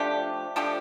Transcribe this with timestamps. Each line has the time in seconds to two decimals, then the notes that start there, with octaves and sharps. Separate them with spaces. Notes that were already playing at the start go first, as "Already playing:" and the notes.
Already playing: F3 A3 D4 G4
0.56 F3 A3 D4 G4